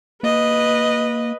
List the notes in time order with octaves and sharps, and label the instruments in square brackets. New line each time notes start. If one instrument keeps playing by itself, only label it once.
[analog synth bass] A#3 [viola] B4 D#5